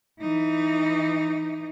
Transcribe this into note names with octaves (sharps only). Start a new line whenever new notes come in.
E3 D#4